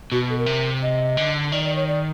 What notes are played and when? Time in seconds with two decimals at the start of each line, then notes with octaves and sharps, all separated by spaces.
0.12 B2 F#4
0.29 A4
0.38 A#4
0.46 C3
0.82 D#5
1.17 D3
1.52 D#3 D5
1.64 D5
1.76 C#5
1.87 D5